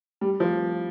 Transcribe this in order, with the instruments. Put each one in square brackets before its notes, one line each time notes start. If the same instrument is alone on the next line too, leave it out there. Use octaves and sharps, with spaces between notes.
[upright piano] G3
F3